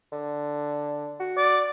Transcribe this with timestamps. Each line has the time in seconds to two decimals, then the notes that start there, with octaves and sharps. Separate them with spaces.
0.12 D3
1.20 F#4
1.38 D5